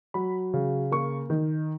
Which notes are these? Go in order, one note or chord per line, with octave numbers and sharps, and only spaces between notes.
F#3 B5
C#3
A#3 C#6
D#3